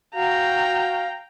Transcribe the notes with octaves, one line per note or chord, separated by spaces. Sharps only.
F#4 F5 G5 A#5